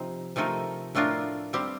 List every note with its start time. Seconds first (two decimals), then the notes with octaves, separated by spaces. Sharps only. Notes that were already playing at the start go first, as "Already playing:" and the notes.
Already playing: C3 F3 C4 D#4
0.36 C3 F3 A3 D#4 A#4
0.95 A2 A3 D4 F4 A#4
1.53 G3 C4 G4